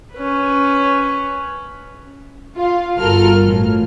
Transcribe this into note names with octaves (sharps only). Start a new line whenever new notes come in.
C#4 B4
F4
G1 F4 F#4 A4 A#4 F6
A2 E3